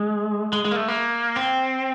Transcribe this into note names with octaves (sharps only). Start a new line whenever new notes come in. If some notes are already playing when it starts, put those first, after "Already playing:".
Already playing: G#3
G#3
G#3
A#3
A3
A#3
C4